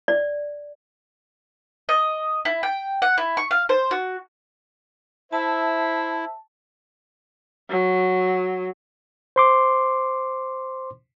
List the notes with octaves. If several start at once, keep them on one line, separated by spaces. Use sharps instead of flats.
D5
D#5
E4
G5
F#5
E4
C#6
F5
C5
F#4
E4 C5 E5 A5
F#3
C5 C6 D6